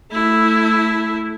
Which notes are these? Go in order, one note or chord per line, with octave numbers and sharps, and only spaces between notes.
A3 E4